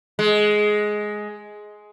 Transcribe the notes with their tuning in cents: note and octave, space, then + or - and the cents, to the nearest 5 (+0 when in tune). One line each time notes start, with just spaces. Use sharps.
G#3 +10